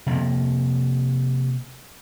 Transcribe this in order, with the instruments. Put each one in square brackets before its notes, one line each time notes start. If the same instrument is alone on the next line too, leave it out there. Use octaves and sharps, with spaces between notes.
[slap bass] C3 F3 A#3